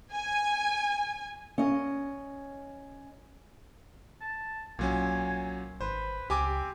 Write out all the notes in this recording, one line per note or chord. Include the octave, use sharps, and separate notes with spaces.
G#5
C#4 D#5
A5
B1 A#2 F#3 C#4 G#5
G#1 B4 C5
C#2 C4 G4 G#5 D6